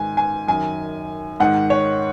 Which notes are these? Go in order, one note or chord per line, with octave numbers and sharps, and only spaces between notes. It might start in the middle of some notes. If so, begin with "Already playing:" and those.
Already playing: G#2 D#3 G#5
G#5
F#2 D#3 G#5
G#2 D#3 F#5
C#5